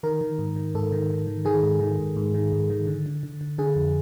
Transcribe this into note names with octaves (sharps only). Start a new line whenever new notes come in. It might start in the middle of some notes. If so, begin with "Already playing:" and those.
D#3 A#4
D#3
G#2
D#3
G#2 A4
D#3
D#3
D#3
D#3 G#4
G#2
D#3
G#2
G#2
D#3
G#2
D#3
D3
D3
D3
D3
D3 G#4
F2